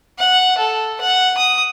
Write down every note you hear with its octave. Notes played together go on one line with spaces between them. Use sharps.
F#5
A4
F#5
D#6